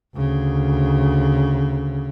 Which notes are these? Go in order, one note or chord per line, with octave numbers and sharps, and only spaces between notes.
D2 C#3